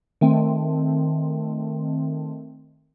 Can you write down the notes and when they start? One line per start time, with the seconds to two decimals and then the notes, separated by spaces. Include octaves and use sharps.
0.21 D#3 A3 C4